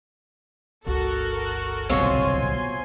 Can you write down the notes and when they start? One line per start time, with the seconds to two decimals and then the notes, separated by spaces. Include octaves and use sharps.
0.87 G1 C#2 F#4 A4 A#4
1.90 D1 C2 B2 C4 F4 C#5 G#5 C6